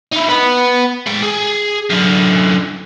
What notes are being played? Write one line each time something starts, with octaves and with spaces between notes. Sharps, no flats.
D#4 E4
B3 B4
G#3 G5
G#4
F#2 D3